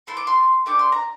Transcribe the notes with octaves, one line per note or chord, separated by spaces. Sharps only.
A3 E4 A4 C6
D6
C6
A3 D4 G4 D6
C6
A#5